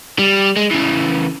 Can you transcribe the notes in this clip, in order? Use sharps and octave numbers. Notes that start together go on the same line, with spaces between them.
G3
G#3
C#3 E3